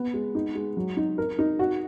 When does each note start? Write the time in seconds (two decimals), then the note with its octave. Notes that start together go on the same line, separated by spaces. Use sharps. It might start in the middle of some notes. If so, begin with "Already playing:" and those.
Already playing: B3
0.14 G#3
0.35 D#4
0.55 G#3
0.77 F#3
0.97 D#4
1.18 A#4
1.39 D#4
1.59 F#4